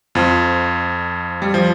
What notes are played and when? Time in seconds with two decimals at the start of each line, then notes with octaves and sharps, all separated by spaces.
0.15 F2 F3
1.42 G3
1.54 F3